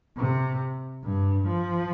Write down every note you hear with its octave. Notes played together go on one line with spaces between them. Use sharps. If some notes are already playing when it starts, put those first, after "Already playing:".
C3
G2
F3